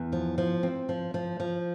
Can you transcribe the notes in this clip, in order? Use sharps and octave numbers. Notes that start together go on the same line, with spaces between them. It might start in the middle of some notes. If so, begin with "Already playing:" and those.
Already playing: E2
F3
F3
C4
F3
F3
F3